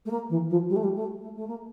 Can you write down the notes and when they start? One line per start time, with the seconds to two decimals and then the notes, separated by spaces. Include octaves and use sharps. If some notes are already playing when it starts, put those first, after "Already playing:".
0.05 A3
0.10 A#3
0.29 E3
0.50 F3
0.69 G3
0.76 A3
0.83 G3
0.95 A3
1.21 A3
1.35 A3
1.47 A#3